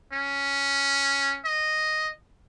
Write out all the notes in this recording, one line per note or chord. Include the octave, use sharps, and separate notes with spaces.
C#4
D#5